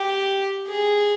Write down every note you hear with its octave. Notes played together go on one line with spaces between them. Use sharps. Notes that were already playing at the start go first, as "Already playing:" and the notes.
Already playing: G4
G#4